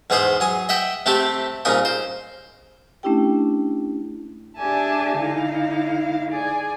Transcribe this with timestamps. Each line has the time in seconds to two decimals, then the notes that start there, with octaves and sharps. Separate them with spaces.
0.10 E2 G#2 B3 G#4 C5 C6
0.40 F#3 G#5 D#6
0.69 D#5 E5 F#5 G5
1.06 C3 A3 C4 G4 A4
1.65 C2 A#2 C#3 D#4 A#4 D#6
1.85 C5
3.03 A3 C#4 D4 E4 G4 G5
4.57 D4 G4 G#4 E5 G#5 A5
5.20 D3 D#4 E4 F5
6.30 G#4 D5 G#5